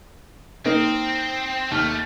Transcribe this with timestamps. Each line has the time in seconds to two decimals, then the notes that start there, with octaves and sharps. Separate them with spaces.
0.66 A#3 C4 D#4
1.71 D#2 A3 F6